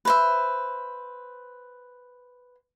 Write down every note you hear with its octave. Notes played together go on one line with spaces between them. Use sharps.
B4 C5 E5